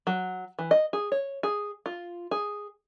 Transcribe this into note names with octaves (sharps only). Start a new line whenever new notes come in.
F#3
E3
D#5
G#4
C#5
G#4
F4
G#4